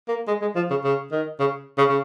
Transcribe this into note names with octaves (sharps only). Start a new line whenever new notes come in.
A#3
G#3
G#3
F3
C#3
C#3
D#3
C#3
C#3
C#3